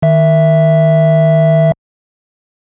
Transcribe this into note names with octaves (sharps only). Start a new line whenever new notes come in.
D#3 E5